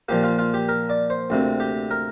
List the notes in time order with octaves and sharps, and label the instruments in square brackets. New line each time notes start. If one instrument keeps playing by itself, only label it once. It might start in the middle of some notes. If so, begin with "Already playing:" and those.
[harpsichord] A#2 F3 A#3 G4
F4
F4
G4
A#4
D5
C5
D2 C3 A#3
G4
A#4